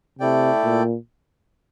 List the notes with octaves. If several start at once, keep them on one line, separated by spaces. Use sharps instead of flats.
C3 A3 E4 A4 D5 G5
A#2